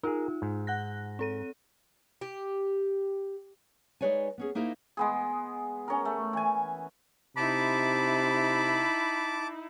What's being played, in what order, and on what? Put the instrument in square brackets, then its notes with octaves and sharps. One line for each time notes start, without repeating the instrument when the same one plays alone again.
[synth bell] D#4 F4 [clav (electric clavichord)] G#4 A#4
[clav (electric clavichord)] G#2
[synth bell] F#5 F#6 A#6
C4 A4 D#7
[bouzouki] G4
[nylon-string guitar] G#3 D#4 B4 C#5 D5 G#5
B3 C#4 G#4
A#3 D#4 E4 A#4 C5
[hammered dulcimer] G#3 B3 G#4
C#4 A#4
A3
E3 G#5
[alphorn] C3 [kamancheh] D#4 E4 [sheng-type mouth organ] A5 D6 [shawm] B5